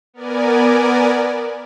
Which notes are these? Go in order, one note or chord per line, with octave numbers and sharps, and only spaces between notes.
B3 A#4 D5 G#5